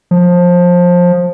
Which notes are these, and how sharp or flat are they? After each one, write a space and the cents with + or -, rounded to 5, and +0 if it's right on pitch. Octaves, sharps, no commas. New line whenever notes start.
F3 +20